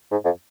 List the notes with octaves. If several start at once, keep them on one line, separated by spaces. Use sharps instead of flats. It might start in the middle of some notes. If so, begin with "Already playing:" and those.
G#2
F2